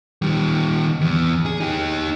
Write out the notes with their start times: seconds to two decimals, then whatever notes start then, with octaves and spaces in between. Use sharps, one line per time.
0.22 D#3 G3
1.01 E2
1.46 G#4
1.60 D#4 G4